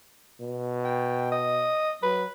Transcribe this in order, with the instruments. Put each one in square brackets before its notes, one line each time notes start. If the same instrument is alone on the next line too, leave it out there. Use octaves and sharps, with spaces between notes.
[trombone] B2
[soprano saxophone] G5
D#5
[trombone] F#3 [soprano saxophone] B4